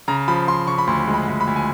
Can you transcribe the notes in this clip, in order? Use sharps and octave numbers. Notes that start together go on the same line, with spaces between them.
C#3 A#5
F3 B5
F3 C6
C#3 C#6
B5
D2 C6
G#3
B5
D2
B5
D2
G#5